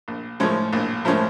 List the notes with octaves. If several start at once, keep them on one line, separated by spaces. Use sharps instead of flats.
A#1
A2 F3 G#3 C#4
A#1
A2 F3 G#3 C#4